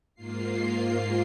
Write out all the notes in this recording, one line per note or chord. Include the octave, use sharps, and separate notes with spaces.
G#2 A#3 F4 C7